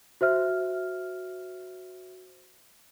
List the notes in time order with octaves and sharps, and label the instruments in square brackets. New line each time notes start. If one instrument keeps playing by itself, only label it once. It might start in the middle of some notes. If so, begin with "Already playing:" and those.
[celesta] F#4 C5 E5 F6